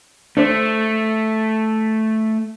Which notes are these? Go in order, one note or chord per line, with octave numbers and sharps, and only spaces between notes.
A3 D4 C5